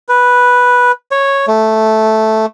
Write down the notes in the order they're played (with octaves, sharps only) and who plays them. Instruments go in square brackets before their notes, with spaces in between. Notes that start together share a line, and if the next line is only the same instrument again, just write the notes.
[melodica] B4
C#5
A3